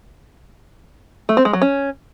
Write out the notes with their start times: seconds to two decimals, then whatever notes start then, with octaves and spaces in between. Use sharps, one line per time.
1.29 A3
1.37 C4
1.45 G#3
1.53 F#3
1.62 C#4